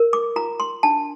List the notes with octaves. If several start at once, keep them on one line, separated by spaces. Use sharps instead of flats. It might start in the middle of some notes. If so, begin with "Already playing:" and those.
Already playing: A#4
D6
F4 A#5
C6
D4 A5